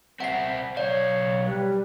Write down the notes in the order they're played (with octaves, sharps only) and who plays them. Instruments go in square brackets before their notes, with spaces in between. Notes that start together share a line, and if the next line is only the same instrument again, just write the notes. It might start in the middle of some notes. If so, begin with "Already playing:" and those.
[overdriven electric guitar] C4 E4 [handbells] F#5 C7
[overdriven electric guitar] B1 F5 [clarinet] C#5 [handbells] D5
[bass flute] G3 [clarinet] B4